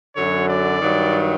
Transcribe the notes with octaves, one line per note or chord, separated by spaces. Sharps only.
F#2 D3 F#3 C#5
D5
G2 D#3 F#3